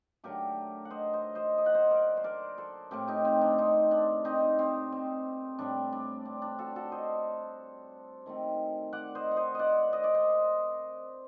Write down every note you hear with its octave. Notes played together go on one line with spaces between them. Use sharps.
D3 F#3 A3 G4 A#4
F#5
C5 D#5
C5 D#5
C5 D#5
D#5
F#5
C5 D#5
A#4 D5
C5
A#4 D5
A4 C5
A2 A3 C4 G4 A#4
D#4 G4
C4
D4
C4 D#4
D4
C4 D#4
C4
C4
A2 G3 C4 D4
D4
C4
D4
F#4 A4
F#4 A4
C5 D#5
D#3 A3 C4
D5 F#5
C5 D#5
F#5
C5 D#5
D5 D#5 F#5
D#5
D5
C5 D#5